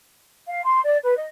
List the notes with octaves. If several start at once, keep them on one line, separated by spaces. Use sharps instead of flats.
F5
C6
D5
B4
D#5